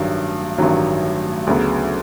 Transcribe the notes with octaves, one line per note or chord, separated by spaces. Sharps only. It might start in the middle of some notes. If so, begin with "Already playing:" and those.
Already playing: A1 G2 D#3 F#3
A1 G2 D#3 F#3
D2 C#3 F#3 B3